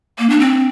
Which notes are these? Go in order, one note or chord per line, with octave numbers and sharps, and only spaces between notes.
A#3
D4
C4